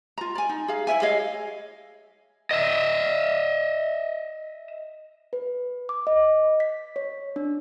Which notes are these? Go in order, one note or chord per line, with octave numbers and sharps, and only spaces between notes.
F4 A#5
D5 G#5
D#4
G#4 F5
E4 C#5 E5 G#5
G#4 C#5 D#5 F5
D#5 E5
B4
D6
D#5
B6
C#5
D4